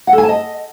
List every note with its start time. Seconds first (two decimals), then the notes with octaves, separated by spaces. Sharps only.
0.07 F#5
0.13 A4
0.18 G#5
0.23 A5
0.29 D#5